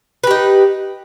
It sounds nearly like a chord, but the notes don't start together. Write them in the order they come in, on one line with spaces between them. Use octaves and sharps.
B4 G4 D#4